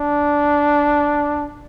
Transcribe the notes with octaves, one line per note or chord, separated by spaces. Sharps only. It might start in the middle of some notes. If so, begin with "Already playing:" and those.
Already playing: D4